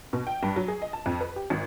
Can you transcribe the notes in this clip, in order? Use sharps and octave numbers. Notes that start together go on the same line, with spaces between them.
B2
G5
G2
F#3
G#4
D#5
A5
F2
B4
G4
G#1